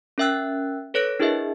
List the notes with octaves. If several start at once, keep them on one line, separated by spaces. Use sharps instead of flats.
C#4 A#4 E5 G5 E6 F#6
A4 B4 C#5 F#6 A#6 D7
D4 E4 G#4 A#4 D#5 E5